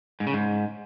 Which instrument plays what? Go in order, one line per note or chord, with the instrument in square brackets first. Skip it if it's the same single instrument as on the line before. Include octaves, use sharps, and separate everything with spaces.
[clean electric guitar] G#2
C#3
G#2